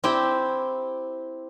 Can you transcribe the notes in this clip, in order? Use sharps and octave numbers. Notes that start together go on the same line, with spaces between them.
C4 E4 G4 G5